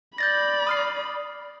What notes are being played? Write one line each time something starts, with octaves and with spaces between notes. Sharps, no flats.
D5 B5 G6 A6 A#6
D#6 F6 C7